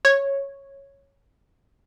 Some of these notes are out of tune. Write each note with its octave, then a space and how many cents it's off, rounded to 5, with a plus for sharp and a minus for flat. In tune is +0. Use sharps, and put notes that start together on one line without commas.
C#5 -5